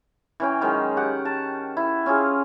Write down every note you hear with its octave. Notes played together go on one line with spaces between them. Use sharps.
E3 C#4 G5
D#3 F#3 G#3
G4 F#5
A5
E4
C#4 F4 G#4